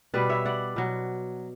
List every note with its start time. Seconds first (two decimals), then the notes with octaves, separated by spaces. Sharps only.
0.14 B2 G3 B4 D5
0.29 C#5 E5
0.45 D5 F#5
0.76 B2 F#3